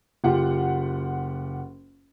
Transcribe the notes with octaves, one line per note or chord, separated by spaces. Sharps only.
F#1 F4 G4 F#5